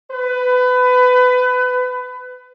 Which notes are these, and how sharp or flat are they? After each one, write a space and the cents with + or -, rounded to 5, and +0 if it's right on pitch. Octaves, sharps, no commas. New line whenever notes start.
B4 +25